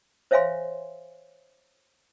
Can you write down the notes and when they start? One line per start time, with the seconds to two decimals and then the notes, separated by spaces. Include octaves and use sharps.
0.31 C5 C#5 E5 F5 G#5 C6